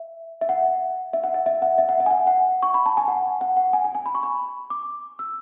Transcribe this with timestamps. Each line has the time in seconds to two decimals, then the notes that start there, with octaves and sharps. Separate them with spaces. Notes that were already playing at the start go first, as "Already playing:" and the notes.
Already playing: E5
0.41 E5
0.49 F#5
1.13 E5
1.24 F#5
1.34 E5
1.46 E5
1.62 F#5
1.78 E5
1.89 F#5
2.00 E5
2.06 G#5
2.11 F#5
2.27 F#5
2.63 C#6
2.74 B5
2.86 A5
2.97 G#5
3.08 F#5
3.41 F#5
3.57 F#5
3.73 G#5
3.84 G#5
3.95 G#5
4.06 B5
4.15 C#6
4.23 B5
4.70 D6
5.19 E6